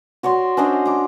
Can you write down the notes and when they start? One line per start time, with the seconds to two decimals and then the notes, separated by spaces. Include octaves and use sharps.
0.23 F#4 C#5 D5 C6
0.57 C#4 D4 C5 D#5
0.86 A#5 D6